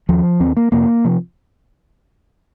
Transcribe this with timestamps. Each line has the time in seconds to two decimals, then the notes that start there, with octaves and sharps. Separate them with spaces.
0.09 D#2 F3
0.40 D#2 C4
0.57 A#3
0.72 F2 C3 A#3
1.05 C3 F3